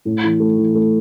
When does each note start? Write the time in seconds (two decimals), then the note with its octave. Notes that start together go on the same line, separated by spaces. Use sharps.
0.05 A2
0.23 E3
0.40 A3
0.58 E3
0.75 A3